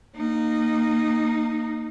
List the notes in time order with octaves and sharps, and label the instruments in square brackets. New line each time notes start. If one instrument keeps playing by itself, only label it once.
[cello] A#3 D#4